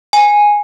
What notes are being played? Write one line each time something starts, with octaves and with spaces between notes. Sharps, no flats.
G#5